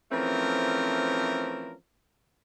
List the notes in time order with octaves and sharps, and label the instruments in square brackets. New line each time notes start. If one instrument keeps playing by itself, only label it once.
[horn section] E3 F3 A3 C4 C#4 A#4